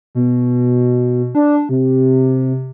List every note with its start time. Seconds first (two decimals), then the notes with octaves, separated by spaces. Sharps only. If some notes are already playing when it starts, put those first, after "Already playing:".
0.15 B2
1.35 D4
1.69 C3